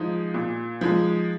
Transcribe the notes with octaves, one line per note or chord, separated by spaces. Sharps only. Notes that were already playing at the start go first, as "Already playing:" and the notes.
Already playing: F3 G#3 D#4
A#2
F3 G#3 D#4